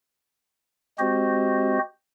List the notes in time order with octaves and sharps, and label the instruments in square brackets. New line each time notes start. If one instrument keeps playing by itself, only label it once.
[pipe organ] G#3 C4 F#4 G4 C5 D#5